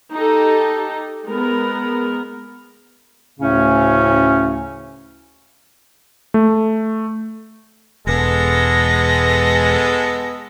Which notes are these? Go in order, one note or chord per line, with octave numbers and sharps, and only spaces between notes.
D#4 G4 A4
G#3 B3 A#4
D2 A2 C#3 A3 C#4
A3
E1 G#3 B3 A4 A#6